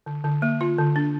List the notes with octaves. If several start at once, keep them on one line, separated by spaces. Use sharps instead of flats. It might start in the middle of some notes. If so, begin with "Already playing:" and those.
D3
D3
A#3
F4
D3
D4